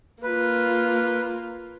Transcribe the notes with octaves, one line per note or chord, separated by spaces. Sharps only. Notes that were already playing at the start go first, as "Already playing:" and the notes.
A#3 F4 B4